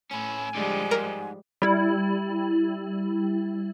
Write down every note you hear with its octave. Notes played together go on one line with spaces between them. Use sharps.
A2 C#4 E4 G#5
A2 D3 F3 G3 G#3
G#2 A#4
G3 E4